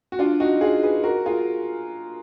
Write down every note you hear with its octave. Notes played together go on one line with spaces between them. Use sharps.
F#4
D4 F4
D#4 F#4
F4 G#4
G#4 B4
F#4 A#4
F4 G#4